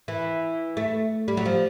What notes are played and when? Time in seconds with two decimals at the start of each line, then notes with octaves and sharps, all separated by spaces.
0.08 E3
0.77 A3
1.28 G3
1.37 F#3
1.45 F3